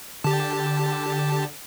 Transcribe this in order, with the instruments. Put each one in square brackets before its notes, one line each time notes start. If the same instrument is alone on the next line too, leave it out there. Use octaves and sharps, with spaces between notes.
[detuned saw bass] D3 [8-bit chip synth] G4 A5